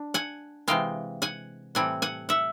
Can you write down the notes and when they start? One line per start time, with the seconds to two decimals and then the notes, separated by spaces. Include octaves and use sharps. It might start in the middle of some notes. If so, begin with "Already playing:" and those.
Already playing: D4
0.14 F#5 G#5
0.68 C3 E3 G#3 F5 G5
1.22 F#5 G#5
1.75 A2 E3 G3 C4 F#5 G#5
2.02 F#5 G#5
2.29 E5 F#5